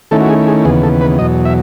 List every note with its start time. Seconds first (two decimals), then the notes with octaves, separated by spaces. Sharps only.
0.11 D#3 A3 C#4 E4 A4
0.21 F#4
0.29 G#4
0.48 G#4
0.65 D#2 C#3 E3 B3 G#4
0.83 A4
1.01 B4
1.18 E2 B2 F#3 D#5
1.45 E5